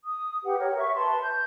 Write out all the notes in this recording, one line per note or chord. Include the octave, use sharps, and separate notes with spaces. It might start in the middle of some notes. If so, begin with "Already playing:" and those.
D#6
G4 B4 F#5
A#4 C#5 F#5
E5 C#6
B4 A5 C6
G6